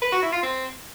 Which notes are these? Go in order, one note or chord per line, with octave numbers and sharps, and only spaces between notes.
B4
F#4
E4
F4
C4